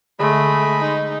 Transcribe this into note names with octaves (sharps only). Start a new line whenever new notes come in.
D3 G#3 A3 B5
D#4